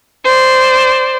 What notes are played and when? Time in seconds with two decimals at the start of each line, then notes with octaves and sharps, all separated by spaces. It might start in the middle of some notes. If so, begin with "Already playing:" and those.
0.24 C5 D5